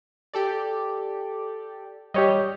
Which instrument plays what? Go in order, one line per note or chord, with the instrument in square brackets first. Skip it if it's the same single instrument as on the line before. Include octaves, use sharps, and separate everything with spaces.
[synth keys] G4 A4 D5
[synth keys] G3 [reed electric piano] G4 C#5 D#5